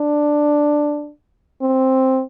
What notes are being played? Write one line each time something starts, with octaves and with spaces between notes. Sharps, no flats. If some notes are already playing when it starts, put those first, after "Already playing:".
Already playing: D4
C4